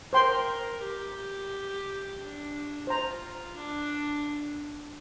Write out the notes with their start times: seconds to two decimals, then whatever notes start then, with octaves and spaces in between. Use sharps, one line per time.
0.13 A#4 C5 G5 C6
0.82 G4
2.19 D4
2.87 F4 C5 A#5
3.56 D4